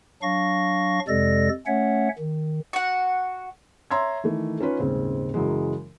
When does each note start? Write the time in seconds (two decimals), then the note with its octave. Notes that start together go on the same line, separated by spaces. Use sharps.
0.22 F#3 D4 F5 C#6 A#6
1.08 F2 C3 G#3 A4 D5 A#6
1.67 A3 C#4 C#5 E5 F#5
2.19 D#3
2.73 F#4 F#5
3.91 C#5 E5 A#5 C6 E6 G#6
4.24 D#3 E3 A3
4.60 C#4 D#4 F4 B4 C#5
4.79 D#1 G#2 C#3 C4
5.34 F#2 C#3 E3 F#3 G#3